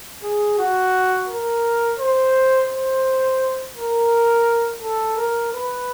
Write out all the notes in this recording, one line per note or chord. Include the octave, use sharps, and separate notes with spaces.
G#4
F#4
A#4
C5
C5
A#4
A4
A#4
B4